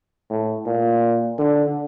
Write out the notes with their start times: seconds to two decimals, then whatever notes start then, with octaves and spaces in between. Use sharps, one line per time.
0.31 A2
0.66 A#2
1.39 D3